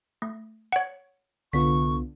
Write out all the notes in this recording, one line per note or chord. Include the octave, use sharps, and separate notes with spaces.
A3
C#5 F#5
C2 D3 B3 F4 C#6 B6